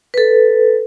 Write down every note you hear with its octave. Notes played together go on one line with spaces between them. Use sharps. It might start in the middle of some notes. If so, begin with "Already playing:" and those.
A4 B4